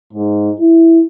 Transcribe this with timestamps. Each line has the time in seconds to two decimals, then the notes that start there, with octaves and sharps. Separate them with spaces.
0.13 G#2
0.60 E4